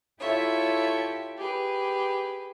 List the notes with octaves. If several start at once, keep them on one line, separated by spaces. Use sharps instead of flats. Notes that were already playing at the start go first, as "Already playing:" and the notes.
E4 F4 G4 A4 C#5 E5
G4 G#4 B4